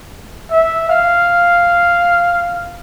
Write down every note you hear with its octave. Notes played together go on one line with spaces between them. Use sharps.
E5
F5